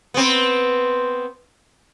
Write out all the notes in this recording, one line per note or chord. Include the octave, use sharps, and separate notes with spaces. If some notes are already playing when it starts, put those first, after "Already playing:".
B3 C4